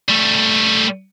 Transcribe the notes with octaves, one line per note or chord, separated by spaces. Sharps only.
G3 A3